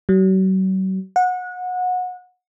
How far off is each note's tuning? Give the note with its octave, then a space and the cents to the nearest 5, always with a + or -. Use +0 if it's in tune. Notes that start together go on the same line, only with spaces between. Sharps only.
F#3 +40
F#5 -25